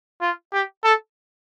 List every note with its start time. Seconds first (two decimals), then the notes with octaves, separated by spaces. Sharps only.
0.21 F4
0.53 G4
0.84 A4